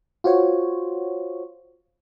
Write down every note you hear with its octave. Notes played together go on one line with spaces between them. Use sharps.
F4 F#4 C5 C#5